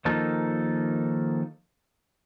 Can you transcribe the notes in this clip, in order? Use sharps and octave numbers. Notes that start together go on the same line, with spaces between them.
D#3 F3 A#3 D#4 A4